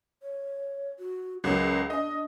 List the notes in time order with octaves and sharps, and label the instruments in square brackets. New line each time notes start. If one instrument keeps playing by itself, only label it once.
[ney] C#5
F#4
[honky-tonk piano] C#2 F#3 [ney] A#4
[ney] D4 [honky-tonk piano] D#5